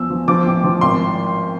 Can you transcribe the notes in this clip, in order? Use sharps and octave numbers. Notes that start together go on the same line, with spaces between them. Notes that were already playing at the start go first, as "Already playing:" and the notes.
Already playing: E2 F3 E6
F3
F3 D6
A1
F3
G#1 C6